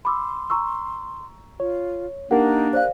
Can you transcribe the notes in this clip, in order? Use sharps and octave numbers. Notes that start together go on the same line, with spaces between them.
B5 C6 D6 E6
A#5 C#6 E6
F4 C#5
A#3 D4 D#4 G4 A#4 F#5
C5 D5 F5 F#6